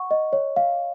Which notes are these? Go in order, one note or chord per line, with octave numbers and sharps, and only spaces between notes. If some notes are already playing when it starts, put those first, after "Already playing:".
Already playing: F#5 C#6
D#5
C#5
F5